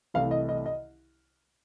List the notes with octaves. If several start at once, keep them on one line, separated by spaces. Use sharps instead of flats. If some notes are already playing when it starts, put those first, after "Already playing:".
C2 C3 E3 A3 F5
D#5
D#5
D#5